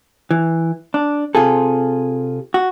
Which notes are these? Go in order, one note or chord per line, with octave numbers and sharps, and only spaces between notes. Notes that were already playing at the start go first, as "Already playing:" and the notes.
E3
D4
C3 F4 G#4 A4
F#4